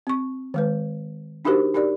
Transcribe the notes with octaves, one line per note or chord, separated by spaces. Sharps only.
C4 C#6
D#3 G#3 B4
D4 D#4 F#4 G4 A#4 C5
D#4 G4 A#4 D5